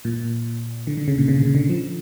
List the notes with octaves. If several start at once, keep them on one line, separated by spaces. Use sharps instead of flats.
A#2
D3
D3
C#3
A#2
C#3
C#3
D3
F3